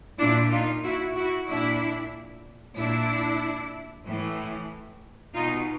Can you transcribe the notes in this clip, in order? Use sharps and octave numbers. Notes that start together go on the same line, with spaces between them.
A#2 D4 E4
D#4 F4
E4 F#4
E4 F#4
A#2 D4 E4
A#2 D4 E4
A2 E3
B2 D#4 F4